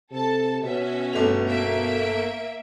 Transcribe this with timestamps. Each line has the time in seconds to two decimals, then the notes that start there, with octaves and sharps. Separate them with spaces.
0.11 C3 A4 A5
0.63 B2 C#4 E5
1.13 G1 A3 F7
1.47 A#3 E5 D7